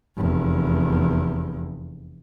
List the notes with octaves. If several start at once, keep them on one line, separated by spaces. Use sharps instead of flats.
F1 E2